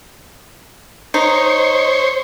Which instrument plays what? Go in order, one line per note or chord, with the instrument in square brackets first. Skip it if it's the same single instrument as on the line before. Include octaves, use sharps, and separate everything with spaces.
[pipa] D#4 [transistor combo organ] C5 C#5